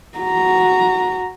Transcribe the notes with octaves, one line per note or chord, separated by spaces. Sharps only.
F#4 A#5